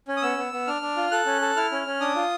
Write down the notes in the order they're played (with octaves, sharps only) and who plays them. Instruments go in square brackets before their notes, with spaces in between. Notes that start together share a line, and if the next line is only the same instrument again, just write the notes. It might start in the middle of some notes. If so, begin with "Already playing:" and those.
[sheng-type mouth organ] C#4
D#6
B3 E6
B3
B3
D4 F6
D4
F4
A4 F#6
C#4
A4
E4 F6
C#4
C#4
D4 D#6
F4